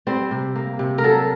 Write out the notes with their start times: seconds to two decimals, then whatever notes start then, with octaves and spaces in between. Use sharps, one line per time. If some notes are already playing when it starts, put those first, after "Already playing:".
0.07 G3 C4
0.31 C3
0.56 A#3
0.79 C3
0.98 A#4
1.04 F#3 A4